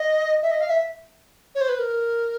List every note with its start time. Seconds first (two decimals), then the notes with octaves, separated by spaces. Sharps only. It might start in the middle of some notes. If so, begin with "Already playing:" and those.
Already playing: D#5
0.42 E5
0.51 D#5
0.61 F5
0.70 E5
1.55 C#5
1.61 C5
1.69 B4
1.79 A#4